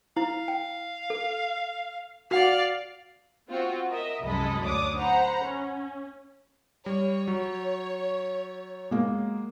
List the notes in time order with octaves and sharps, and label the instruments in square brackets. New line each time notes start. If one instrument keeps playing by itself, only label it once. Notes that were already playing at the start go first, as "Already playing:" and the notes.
[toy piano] E4 [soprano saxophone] F5
[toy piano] G5
A4
[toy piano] F#4 F#5 [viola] D5 F5
[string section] C4 F4 F#4
A#4 D#5 E5
C2 F#2 G#3 A4 D#5 B5
D2 D4 C#5 D6 D#6
C5 F#5 A#5 B5
C#4
[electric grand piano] G3 [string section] C#5
[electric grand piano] F#3
[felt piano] G#3 A#3